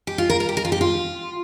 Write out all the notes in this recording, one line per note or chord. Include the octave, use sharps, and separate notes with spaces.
G4
F4
A#4
A#4
G4
A#4
F4
G4
F4